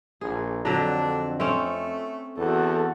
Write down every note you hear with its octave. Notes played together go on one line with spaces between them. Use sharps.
A#1 G#4
F2 D3 F#3 D4
A3 C4 C#4 C#5
E2 F#4 A4